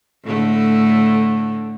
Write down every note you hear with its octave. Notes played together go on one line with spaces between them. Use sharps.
A2 D3 A3